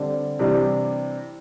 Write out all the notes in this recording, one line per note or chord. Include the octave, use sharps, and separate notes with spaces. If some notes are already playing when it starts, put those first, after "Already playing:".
Already playing: D3 G3 C4 D5
C3 E3 G3 D4